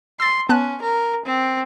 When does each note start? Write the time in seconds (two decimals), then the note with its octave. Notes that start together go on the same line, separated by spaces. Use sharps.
0.20 C6 E6 A6
0.49 B3 C#4 A5 F#6
0.82 A#4
1.26 C4